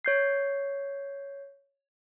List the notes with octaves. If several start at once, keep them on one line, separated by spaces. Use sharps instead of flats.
C#5 G6 C7